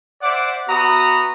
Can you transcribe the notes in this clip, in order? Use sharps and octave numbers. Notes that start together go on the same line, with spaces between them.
C5 D5 E5 F#5 D6
B3 F#4 E5 A#5 B5 D#6